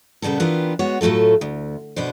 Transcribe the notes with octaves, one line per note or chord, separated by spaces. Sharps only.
A#2 C#3 G3 B3 A4
E3 B3 D4 F4 G4 A#4
G#3 B3 F#4 C#5
A2 F#3 A3 F4 A4
D2
B2 B3 D4 C5